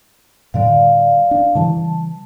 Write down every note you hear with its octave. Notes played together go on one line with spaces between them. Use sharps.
A2 D3 G3 D5 F5
D4
C#3 E3 G3 A5